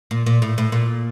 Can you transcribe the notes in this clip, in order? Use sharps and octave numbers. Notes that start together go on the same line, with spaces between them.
A#2
A#2
A2
A2
A#2